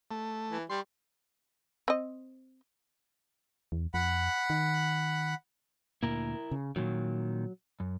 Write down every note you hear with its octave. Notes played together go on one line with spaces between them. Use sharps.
A3
E3
G3 C6
C4 D#5
E2
F2 F#5 B5
D#3
D2 A#2 A#3 E4 A#4
C#3
A#2 D#3 F#3
F#2